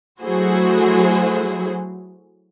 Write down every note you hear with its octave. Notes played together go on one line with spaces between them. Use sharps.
F#3 A3 E4 F#4 G#4 C5